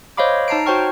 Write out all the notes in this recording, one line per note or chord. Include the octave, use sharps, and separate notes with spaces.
C5 C#5 D#5 F5 B5 D6
D#4 A5 A#5 C7 D7
F#4 C5 C#5 G5 C#6 F6